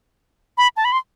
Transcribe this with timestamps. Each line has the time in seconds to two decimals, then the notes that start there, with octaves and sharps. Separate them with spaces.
0.58 B5
0.77 A5
0.85 B5
0.92 C6